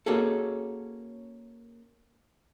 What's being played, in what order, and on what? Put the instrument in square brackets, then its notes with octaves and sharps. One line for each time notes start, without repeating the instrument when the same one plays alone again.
[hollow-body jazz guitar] A#3 C#4 F#4 G#4 A4